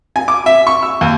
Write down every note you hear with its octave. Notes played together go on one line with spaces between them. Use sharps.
G#5
D6
E5
C#6
E6
D#2